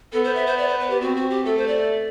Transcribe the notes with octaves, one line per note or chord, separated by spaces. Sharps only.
B3 A4
C5
E5
C5
D5
C5
B4
G4
C4 F#4
F#4
G4
A3 A4
C5
D5